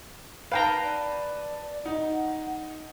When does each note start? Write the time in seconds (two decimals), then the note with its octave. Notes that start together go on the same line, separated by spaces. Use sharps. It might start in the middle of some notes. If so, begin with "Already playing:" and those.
0.52 D#4 B4 F5 G5 A5 A#5
0.83 D5
1.86 D#4 F#5